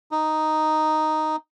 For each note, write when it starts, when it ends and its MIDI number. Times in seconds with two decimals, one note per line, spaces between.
0.11 1.36 63